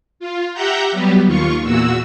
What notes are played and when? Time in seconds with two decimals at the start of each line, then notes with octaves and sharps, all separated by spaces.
0.20 F4
0.54 G4 E5 F#5 A#5 G6
0.92 F#3 G3 B3 G4
1.25 D#2 F4 C#6
1.64 E2 A#2 F#4 E6